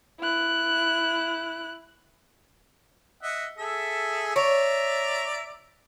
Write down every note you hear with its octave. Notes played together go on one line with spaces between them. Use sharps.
E4 F#6
D#5 E5 F#5
G#4 A4 E5
C#5 D5 E5 A#5